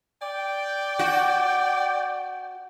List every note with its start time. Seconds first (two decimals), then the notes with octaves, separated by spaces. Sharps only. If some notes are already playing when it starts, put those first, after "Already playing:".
0.22 D5 G5
0.99 F#4